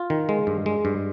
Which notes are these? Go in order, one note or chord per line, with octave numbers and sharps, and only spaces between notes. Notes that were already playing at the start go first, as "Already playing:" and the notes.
Already playing: F4
D#3
G#3
G2
G#3
G2